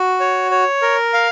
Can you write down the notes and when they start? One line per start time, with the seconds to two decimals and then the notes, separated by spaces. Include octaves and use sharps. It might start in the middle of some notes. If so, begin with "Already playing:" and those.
Already playing: F#4
0.20 C#5
0.51 C#5
0.82 A#4
1.13 F5